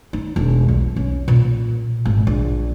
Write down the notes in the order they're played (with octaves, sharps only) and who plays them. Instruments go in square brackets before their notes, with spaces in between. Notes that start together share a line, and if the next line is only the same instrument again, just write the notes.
[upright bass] D#4
E1
B1
C#4
A#2
G#1
A#1